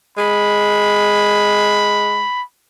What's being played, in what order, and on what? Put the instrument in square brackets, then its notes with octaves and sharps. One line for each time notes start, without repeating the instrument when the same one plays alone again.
[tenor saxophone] G#3 [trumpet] B5